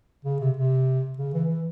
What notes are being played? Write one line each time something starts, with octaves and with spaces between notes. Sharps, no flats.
C#3
C3
C3
C#3
E3
E3